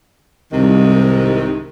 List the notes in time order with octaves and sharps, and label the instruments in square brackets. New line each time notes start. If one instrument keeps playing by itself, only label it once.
[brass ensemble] C2 [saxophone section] G#2 C3 D#3